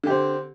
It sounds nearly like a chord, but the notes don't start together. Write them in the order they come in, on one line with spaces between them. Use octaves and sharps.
D3 G4 C4